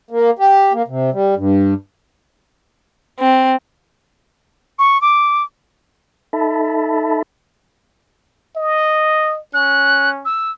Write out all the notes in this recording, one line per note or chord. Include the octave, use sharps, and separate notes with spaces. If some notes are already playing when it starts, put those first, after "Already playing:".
A#3
G4
A#3
C3
G3
G2
C4
C#6
D6
D#4 A4 E5 A5 B5
D#5
C#4 F#6
E6